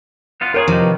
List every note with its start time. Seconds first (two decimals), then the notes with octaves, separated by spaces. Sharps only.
0.41 B3 F4
0.54 F4 G4 G#4 A#4 C#5
0.68 C3 D#3 F3
0.84 B4